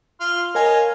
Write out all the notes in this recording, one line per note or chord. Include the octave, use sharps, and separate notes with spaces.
F4 C6 F6
A#4 C#5 D#5 F5 G#5